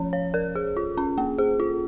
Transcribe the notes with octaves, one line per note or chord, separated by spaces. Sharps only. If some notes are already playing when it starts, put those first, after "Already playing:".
Already playing: F3 C#4 C#5
C#5
A#4
G#4
F4
C#4
A#3
G#4
F4